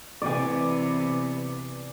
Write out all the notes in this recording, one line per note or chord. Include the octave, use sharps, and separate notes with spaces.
C3 E3 B3 D5 G#5